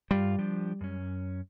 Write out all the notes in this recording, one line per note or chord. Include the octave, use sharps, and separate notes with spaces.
G2 G3 F4
F3 D4 G4
F#2 C#4